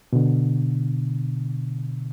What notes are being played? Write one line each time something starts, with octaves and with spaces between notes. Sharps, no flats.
B2 D3